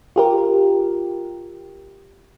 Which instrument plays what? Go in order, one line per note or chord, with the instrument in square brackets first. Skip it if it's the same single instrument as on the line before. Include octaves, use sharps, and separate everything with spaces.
[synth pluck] F4 G4 A#4